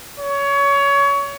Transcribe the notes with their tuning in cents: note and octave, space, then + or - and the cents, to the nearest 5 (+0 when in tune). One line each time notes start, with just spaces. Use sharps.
C#5 +25